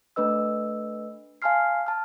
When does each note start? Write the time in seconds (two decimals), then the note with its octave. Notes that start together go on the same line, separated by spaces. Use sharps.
0.16 A3 D4 B4 D#5 E6
1.42 F5 G#5 A5 C6 F6 C7
1.86 A5 F6